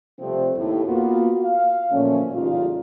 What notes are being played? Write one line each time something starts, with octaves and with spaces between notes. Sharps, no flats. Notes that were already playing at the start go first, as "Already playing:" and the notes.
C3 F3 G3 A3 C4
D#2 A2
A#3 B3 F4 F#4
F5
A#2 D3 F3 F#3 A3 C#4
A1 C#3 G3 D#4 F4